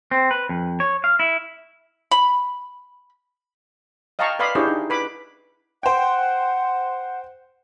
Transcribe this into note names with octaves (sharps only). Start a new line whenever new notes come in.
C4
B4
F2
C#5
F5
E4
B5
D#5 F5 G5 A5 A#5 C#6
B4 D5 F5 B5 C6 D#6
D4 E4 G4 G#4 C5 C#5
D#4
B4 B5 D6
C5 F#5 G5